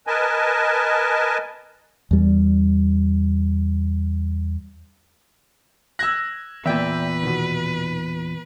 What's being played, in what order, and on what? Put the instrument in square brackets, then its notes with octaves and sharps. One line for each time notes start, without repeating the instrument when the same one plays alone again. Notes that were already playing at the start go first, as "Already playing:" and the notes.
[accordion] A#4 B4 D#5 G#5 A5
[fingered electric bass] E2 G3
[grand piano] E6 A#6 [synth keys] F#6 G#6
[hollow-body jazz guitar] E2 A#2 [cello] B4 [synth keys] E5 G5
[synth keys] B2 D#3